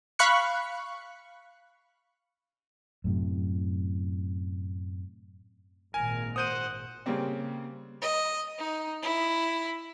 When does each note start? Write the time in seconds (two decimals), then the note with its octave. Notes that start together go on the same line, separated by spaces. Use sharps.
0.19 F5 B5 C#6 F#6 C#7
3.04 F#2 A2 C3
5.94 G#1 A#2 A#4 G#5
6.36 C5 F#5 D#6 G6 D#7
7.06 C#3 G3 A#3 C4
8.02 D#5
8.59 D#4
9.03 E4